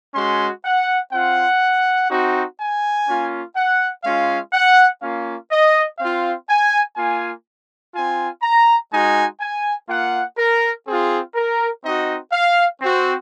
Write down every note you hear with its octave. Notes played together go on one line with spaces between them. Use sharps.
G#3 C#4 F#4 C6
F#5
C4 F4 F#5
C4 D#4 F#4
G#5
A#3 C#4 F4
F#5
G#3 C#4 F4 F5
F#5
A#3 C#4 F4 F5
D#5
C4 F4 F5
G#5
A#3 F4 G#5
C4 F4 G#5
A#5
G#3 D#4 F#4 G#5
G#5
A#3 F4 F#5
A#4
C4 F4 G#4
A#4
C4 D#4 F#4 D#5
F5
C4 F#4